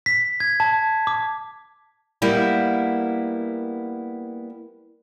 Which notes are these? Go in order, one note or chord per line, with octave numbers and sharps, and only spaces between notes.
B6
G#6
A5
D6
G3 A#3 B3 E4